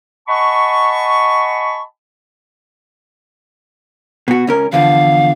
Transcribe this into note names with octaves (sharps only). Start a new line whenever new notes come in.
D#5 F#5 G#5 A5 B5 C#6
B2 F#4
C#2 C#4 A#4
E2 D3 F3 F5